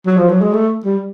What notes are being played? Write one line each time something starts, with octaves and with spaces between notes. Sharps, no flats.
F#3
F3
F#3
G#3
A3
G3